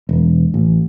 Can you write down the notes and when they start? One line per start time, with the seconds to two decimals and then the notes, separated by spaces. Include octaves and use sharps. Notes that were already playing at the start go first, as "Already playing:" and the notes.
0.09 E1
0.54 A1